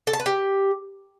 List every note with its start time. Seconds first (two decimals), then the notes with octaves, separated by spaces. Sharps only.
0.07 A4
0.13 A5
0.20 B4
0.26 G4